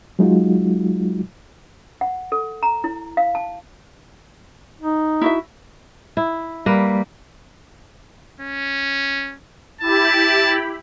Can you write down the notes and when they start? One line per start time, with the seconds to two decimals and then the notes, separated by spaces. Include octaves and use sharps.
0.19 F#3 G#3 D#4 F4 F#4
2.01 F#5
2.32 A4
2.63 A#5
2.84 E4
3.17 F5
3.35 A5
4.81 D#4
5.21 E4 F#4 E5
6.17 E4
6.66 G3 A#3 B4
8.40 C#4
9.81 E4 G4 A5 B5